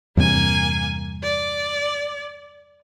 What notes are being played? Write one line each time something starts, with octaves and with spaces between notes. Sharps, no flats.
E2 G2 C3 A#3 G#5
D5